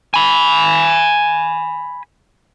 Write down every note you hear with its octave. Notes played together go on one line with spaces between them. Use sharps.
G#5 B5